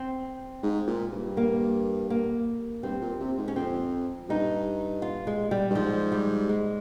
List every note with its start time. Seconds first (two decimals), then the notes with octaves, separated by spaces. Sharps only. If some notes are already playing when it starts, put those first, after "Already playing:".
Already playing: C4
0.63 G#2
0.87 A#2
1.12 G2
1.37 A#3
2.10 A#3
2.83 G2 C4
3.01 A#2
3.20 C3
3.38 G#2
3.48 C#4
3.56 F2 C4
4.29 G2 D#4
5.02 F4
5.27 G#3
5.51 G3
5.70 G2
5.75 G#2 F3
6.12 G3
6.49 G#3